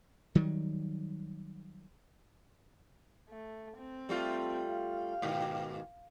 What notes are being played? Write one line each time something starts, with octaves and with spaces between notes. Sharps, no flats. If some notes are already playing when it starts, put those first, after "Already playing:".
D#3 F#3 G3
A3
C4
G3 A3 F4
F5
G#2 B2 D#3